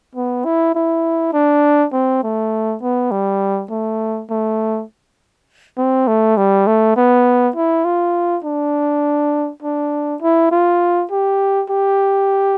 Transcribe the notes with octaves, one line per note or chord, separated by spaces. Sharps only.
B3
E4
E4
D4
C4
A3
B3
G3
A3
A3
C4
A3
G3
A3
B3
E4
F4
D4
D4
E4
F4
G4
G4